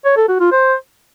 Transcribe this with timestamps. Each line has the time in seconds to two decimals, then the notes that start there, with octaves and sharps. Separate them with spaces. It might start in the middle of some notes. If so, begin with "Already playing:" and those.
0.05 C#5
0.17 A4
0.28 F#4
0.40 F4
0.52 C5